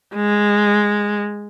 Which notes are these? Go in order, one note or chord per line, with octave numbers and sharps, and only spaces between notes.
G#3